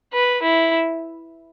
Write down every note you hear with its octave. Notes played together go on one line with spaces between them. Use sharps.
B4
E4